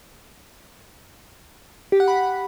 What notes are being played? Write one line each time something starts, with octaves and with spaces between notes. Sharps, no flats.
G4
F#5
B5